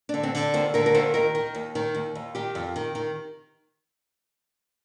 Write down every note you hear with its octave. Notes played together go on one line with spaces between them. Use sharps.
D4
D3
C4
D3
D#2 C5
D3 A#4
A#4
D#2 C5
D#3 A#4
D#3
D#2
D#3
D#2
D#2
D#3 G4
F2
D#3
D#3